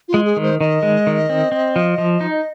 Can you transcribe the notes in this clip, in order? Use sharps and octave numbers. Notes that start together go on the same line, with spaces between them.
F4
G#3
G#4
D#3
C5
D#3 D#5
G#3
D#3
C4
C4
F3
F3
D#4